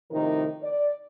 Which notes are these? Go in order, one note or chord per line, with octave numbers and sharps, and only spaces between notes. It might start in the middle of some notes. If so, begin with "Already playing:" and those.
A2 C3 D#3 F3 D#4 A#4
D5